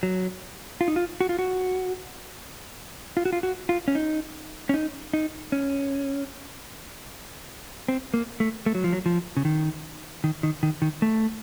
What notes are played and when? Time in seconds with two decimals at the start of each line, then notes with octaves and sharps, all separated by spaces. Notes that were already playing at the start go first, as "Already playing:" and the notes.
0.03 F#3
0.81 F4
0.88 D#4
0.96 F4
1.21 F#4
1.29 F4
1.39 F#4
3.17 F4
3.25 F#4
3.33 F4
3.43 F#4
3.69 F4
3.88 C#4
3.95 D#4
4.69 C#4
4.74 D#4
5.13 D#4
5.52 C#4
7.88 C4
8.14 A#3
8.40 A3
8.66 A3
8.75 F#3
8.84 F3
8.93 F#3
9.06 F3
9.37 C#3
9.45 D#3
10.24 D#3
10.43 D#3
10.63 D#3
10.82 D#3
11.02 A3